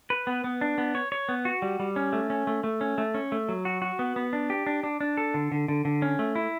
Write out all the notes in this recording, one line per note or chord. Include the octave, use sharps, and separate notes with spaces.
B4
B3
B3
D4
B3
C#5
C#5
B3
F#4
G3
G3
C#4
A3
C#4
A3
A3
C#4
A3
C#4
A3
F#3
F#4
F#4
B3
B3
D4
G4
D4
D4
D4
A4
D3
D3
D3
D3
C#4
A3
E4